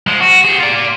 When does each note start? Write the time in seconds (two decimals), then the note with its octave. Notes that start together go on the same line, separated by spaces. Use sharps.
0.07 F3 G#3
0.21 F#4
0.45 G4 G#4
0.59 F4 D5